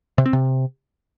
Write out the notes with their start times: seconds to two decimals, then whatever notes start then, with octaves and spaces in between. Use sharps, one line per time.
0.18 C3
0.26 C4
0.33 C3